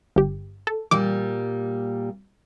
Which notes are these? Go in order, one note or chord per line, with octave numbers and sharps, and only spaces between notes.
G1 G4
A4
A#2 G3 D6